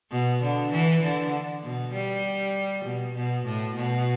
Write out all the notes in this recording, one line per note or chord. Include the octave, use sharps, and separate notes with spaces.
B2
D3
E3
D3
B2
G3
B2
B2
A2
B2